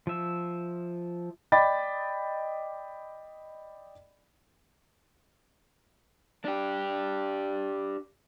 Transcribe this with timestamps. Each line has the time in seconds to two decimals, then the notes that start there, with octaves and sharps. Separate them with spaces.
0.07 F3 E5
1.52 D5 D#5 G5 B5 D6 A6
6.45 D4 G4